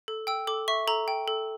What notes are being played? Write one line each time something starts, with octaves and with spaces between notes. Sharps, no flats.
A4
G5 E6
A4 D6
E5 C#6
A4 A#5
G5
A4